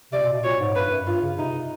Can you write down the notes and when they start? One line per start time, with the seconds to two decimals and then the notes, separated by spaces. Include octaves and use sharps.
0.12 C3 D5
0.23 B2
0.33 B2
0.44 A#2 C#5
0.60 G#2
0.75 G2 B4
0.91 F#2
1.07 G2 F4
1.23 C#3
1.38 C3 D#4